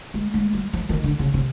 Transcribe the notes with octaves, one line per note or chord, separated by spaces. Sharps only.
G#3
G#3
G3
F3
D#3
D3
C#3
C3